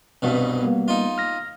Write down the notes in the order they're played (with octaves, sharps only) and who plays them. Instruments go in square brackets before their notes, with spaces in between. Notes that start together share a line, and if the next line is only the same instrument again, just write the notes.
[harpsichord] C2 G2 B2
[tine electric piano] G3 A#3 B3
[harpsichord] D#4 F4
[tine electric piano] F6 A#6